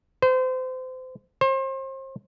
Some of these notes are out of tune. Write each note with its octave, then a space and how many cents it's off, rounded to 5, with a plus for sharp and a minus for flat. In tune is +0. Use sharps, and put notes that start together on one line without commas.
C5 -30
C5 +35